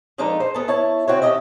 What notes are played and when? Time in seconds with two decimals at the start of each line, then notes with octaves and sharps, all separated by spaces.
0.18 F3 G#3 D4 D#4 A4 B4
0.40 C5
0.54 D2 B3 A4
0.68 E4 C#5 A5
1.08 C#3 C4 E4 F#4 C5 C#5
1.22 D#3 G4 D#5 E5